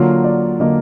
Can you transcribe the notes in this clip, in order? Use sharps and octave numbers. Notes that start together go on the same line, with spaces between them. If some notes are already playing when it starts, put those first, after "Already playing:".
Already playing: D3 F#3 A#3 F4
D5
D3 F#3 A#3 D#5